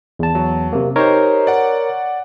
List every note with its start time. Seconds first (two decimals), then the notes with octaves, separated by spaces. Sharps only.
0.19 E2 A5
0.35 F#3
0.73 C3 A#3
0.96 D#4 G4 A#4 C5 C#5
1.47 D5 F#5